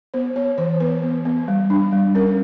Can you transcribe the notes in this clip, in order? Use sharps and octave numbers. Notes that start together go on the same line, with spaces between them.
B3 C5
B3 C#5
E3 C5
B3 B4
B3
B3
G3
D4
G3
C#4 A#4